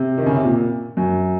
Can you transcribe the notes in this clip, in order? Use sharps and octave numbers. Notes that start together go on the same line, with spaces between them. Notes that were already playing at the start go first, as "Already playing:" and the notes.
Already playing: C3
D#3
C#3
C3
A#2
F#2